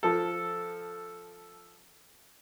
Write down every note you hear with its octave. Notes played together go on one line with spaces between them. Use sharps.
F3 A4